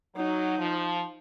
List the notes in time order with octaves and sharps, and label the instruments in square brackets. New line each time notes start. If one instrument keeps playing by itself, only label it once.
[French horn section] F#3 [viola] D#4
[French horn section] F3